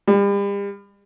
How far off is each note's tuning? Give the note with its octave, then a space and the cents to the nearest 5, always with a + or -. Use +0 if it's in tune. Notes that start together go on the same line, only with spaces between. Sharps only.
G3 +35